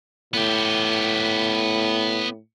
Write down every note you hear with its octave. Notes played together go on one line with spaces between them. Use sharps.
A2 B3 G4